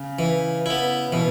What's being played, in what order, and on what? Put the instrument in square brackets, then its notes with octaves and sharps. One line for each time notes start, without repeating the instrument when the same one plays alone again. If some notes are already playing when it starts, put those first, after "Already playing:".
Already playing: [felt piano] C#3
[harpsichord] E3
B3 E4
[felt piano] B2 [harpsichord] E3